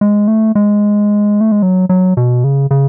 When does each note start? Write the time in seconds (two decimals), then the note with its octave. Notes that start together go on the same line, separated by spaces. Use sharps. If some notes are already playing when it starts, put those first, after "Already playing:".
0.01 G#3
0.28 A3
0.55 G#3
1.41 A3
1.52 G#3
1.63 F#3
1.89 F#3
2.17 B2
2.44 C#3
2.71 C#3